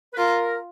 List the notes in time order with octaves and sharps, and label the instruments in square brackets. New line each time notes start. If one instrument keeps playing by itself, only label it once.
[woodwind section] B4
[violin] F4 [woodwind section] A#4